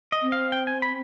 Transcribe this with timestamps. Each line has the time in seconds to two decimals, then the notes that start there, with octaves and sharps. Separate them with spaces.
0.12 D#5
0.23 C4
0.32 F5
0.52 G5
0.67 G#5
0.82 B5